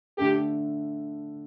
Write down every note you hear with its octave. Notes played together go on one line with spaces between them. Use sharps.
D3 A3 D4 G4 A4